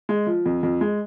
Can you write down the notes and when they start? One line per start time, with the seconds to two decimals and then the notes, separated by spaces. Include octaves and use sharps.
0.09 G#3
0.27 F3
0.46 F2
0.63 F2
0.81 G#3